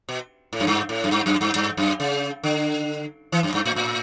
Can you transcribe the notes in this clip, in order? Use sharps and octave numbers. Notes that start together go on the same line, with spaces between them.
B2
A2
F#2
G2
A2
F#2
G2
F#2
G2
G2
F#2
C#3
D3
E3
F#2
G2
A2
A2